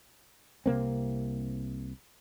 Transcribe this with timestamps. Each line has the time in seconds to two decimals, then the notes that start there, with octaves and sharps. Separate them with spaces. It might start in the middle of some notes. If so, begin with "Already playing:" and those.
0.66 C2 C3 A#3 C4